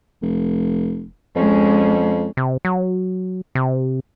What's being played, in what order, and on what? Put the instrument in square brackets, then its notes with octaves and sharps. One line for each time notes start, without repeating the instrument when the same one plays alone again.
[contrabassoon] F1
[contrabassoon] F2 [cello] G#3 C#4
[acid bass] C3
F#3
C3